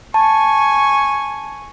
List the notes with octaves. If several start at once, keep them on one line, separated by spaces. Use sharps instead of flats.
G#5 A5 C#6